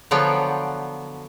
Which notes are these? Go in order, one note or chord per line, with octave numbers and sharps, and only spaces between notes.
D3 F3 F#3 B3 G5